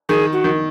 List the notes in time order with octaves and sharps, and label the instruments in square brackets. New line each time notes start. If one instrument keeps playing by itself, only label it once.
[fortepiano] D#3 [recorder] G#4
[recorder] F#4
[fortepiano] D#3